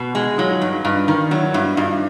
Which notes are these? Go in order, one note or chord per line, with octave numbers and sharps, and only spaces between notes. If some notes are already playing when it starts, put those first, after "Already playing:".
Already playing: B2
G#3
F#3 D#4 F4
G2
G2 D#4 F4
D#3
F#3 E4 F#4
G2 E4 F#4
G2 D#4 F4